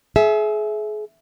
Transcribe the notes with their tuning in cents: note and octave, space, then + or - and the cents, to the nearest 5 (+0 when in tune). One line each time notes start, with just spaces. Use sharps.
G#4 +35 E5 +0